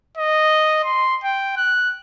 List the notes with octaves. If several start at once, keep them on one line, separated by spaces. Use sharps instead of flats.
D#5
C6
G5
F#6